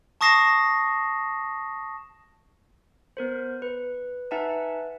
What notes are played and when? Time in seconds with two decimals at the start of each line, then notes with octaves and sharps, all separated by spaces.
0.21 A5 C#6 D#6 A#6 C7 E7
3.17 B3 A#4 C5
3.62 B4
4.31 D#4 B4 E5 F#5 G#5 A5